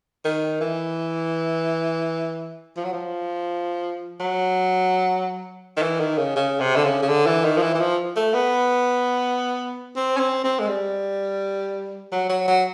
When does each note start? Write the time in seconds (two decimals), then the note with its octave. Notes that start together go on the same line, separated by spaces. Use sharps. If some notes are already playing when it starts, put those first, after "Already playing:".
0.25 D#3
0.60 E3
2.77 F3
2.84 F#3
2.93 F3
4.20 F#3
5.77 D#3
5.82 E3
6.00 D#3
6.18 C#3
6.36 C#3
6.60 C3
6.76 D3
6.84 C#3
7.02 C#3
7.09 D3
7.26 E3
7.45 D#3
7.57 F3
7.62 E3
7.74 E3
7.80 F3
8.16 A3
8.34 B3
9.96 C4
10.16 C#4
10.20 C4
10.44 C4
10.59 G#3
10.68 G3
12.12 F#3
12.29 F#3
12.48 F#3